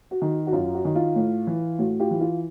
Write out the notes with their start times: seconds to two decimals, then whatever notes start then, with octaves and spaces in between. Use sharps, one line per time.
0.11 F#4
0.22 D#3
0.47 F#4
0.52 F#2 F4
0.74 F#4
0.85 D#3
0.96 F4
1.16 A2
1.47 E3
1.79 A2 F#4
2.00 F4 G4
2.11 E3
2.21 F4